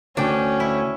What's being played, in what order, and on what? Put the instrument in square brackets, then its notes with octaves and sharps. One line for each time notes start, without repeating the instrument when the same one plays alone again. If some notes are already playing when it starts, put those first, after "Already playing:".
[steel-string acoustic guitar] D2 G5 [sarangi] C#4 [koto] D4
[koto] E4